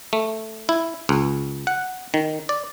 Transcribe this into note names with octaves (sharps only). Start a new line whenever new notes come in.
A3
E4
C#2
F#5
D#3
D5